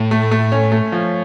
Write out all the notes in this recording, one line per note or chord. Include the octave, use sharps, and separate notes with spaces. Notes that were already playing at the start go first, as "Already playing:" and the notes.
Already playing: A2
A3
A3
C#4
A3
F3